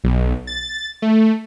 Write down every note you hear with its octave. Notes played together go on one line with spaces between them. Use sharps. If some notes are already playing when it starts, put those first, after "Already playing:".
B1
A6
A3